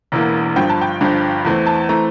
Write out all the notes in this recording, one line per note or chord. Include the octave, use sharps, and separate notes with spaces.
E1 E2 E3 A#3
G1 G2 F3 G5
A5
G5
G1 G2 F3
E2 E3 A3 C4
A5
E3 A3 C4 A#5